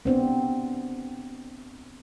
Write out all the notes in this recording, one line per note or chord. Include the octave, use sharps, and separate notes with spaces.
B3 C4 D4